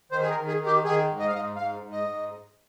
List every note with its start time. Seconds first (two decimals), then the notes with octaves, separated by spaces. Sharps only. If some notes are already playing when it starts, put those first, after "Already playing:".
0.12 D#3 C5
0.22 G#4
0.30 A#4
0.36 D#3
0.47 G#4
0.59 D#3
0.66 G4
0.83 D#3 G#4
1.08 G#2
1.19 D#5
1.27 F5
1.32 G#2 D#5
1.56 G#2 F5
1.80 G#2
1.92 D#5
2.04 G#2